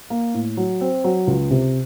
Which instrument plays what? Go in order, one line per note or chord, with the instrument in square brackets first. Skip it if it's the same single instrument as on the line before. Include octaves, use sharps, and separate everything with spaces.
[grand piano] A#3
A2
F#3
C4
F#3
C#2
C3